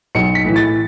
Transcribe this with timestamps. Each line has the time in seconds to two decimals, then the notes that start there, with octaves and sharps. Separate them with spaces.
0.15 B1 C#7
0.35 B6
0.45 A2 E3
0.56 A6